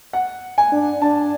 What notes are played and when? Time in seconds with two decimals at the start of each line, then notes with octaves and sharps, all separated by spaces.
0.13 F#5
0.58 G#5
0.72 D4
1.02 D4 A5